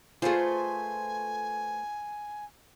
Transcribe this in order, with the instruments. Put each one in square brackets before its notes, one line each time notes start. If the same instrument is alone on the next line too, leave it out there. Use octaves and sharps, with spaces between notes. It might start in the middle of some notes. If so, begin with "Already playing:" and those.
[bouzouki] A3 B4 C5 [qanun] F4 G#4 [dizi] G#5